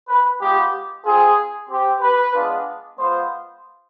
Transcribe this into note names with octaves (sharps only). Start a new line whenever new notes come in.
B4
G#3 B3 F4 G4
C4 F4 G#4
C4 G4
B4
G#3 B3 D4 F4
G#3 B3 F4 C5